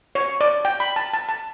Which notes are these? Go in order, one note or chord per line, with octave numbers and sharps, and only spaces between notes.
C#5
D5
G5
B5
A5
A5
A5